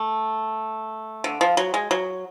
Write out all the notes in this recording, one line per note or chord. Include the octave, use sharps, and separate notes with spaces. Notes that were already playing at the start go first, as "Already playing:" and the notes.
Already playing: A3
D3
F3
F#3
G#3
F#3